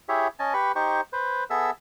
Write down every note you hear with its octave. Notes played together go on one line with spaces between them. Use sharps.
E4 G4 G#4 C#5 E5
C#4 D#5 G#5 A5
G4 B4 B5 C#6
D#4 G4 C5 C#6
B4 C5
B3 G#4 A4 E5 E6